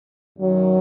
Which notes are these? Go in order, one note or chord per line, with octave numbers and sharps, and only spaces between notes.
F#2 D#3 F#3